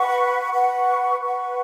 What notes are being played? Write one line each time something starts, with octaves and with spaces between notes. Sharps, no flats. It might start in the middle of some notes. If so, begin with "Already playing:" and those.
Already playing: B4 F#5 C#6
B4 F#5 C#6
B4 F#5 C#6